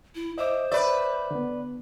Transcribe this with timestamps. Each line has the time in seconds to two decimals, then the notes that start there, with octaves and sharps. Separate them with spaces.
0.15 E4
0.38 C5 D#5 E5 D6
0.72 B4 D5 E5
1.31 D3 B3